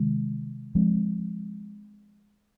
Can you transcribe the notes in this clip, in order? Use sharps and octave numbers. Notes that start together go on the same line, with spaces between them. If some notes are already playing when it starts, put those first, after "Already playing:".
Already playing: C3 D#3 G#3
F3 G#3 C4